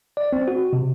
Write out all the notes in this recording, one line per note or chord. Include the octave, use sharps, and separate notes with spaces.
D5
C4
F#4
C3